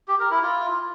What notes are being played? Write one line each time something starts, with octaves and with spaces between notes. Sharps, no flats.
G4
A#4
E4
F4